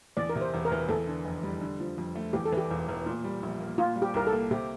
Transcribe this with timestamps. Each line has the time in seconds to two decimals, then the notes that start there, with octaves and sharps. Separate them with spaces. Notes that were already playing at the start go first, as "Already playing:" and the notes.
0.17 E2 D5
0.30 A#4
0.35 C3
0.41 C5
0.54 E1
0.65 A#4
0.72 E3
0.89 E2 A4
1.07 D3
1.25 F1
1.43 G3
1.61 D3
1.80 F3
1.98 F2
2.16 A3
2.33 E2 G4
2.45 A4
2.52 E3 G4
2.71 E1
2.88 E1
3.06 A#2
3.24 G3
3.43 A#1
3.60 A#3
3.78 A#2 F4
3.96 G3
4.02 G4
4.14 C2 A#4
4.27 A4
4.32 A#3
4.51 C3 G4